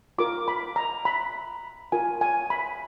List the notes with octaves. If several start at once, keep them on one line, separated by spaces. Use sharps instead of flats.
F4 A#4 D6
B5
A#5
B5
F4 A#4 G#5
G#5
B5